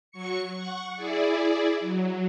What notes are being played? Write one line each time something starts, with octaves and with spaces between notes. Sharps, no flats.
F#3 C#6 C#7
F#5 C#6
E4 G#4 D5
F#3